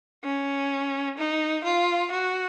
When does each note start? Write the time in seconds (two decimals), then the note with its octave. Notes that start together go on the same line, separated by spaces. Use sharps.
0.24 C#4
1.18 D#4
1.64 F4
2.12 F#4